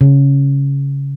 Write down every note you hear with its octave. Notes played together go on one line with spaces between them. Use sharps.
C#3